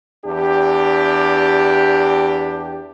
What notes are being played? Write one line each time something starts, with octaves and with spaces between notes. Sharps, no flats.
E2 D4 G4